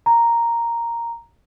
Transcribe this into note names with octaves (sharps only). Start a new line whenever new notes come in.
A#5